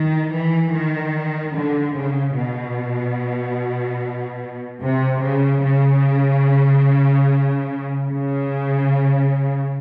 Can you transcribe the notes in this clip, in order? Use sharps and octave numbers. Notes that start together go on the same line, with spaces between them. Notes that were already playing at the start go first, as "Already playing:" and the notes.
Already playing: D#3
E3
D#3
D3
C#3
B2
C3
C#3
C#3
C#3